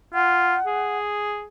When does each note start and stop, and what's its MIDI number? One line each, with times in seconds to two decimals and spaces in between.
0.14 0.55 65
0.14 0.98 78
0.66 1.45 68